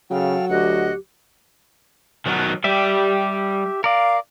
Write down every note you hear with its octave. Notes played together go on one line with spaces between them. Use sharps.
C#3 F#3 A4 F5 G5
D2 F#4 G4 D#5 F#5
D#3 F#3 B3
G3 G4 D5 E5
A#4 D5 F5